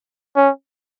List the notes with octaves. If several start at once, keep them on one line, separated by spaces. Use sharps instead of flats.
C#4